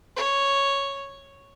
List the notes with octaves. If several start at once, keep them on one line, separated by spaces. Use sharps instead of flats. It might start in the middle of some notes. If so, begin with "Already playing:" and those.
C#5